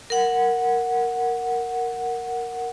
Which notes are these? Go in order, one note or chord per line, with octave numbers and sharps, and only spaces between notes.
A#4 F#5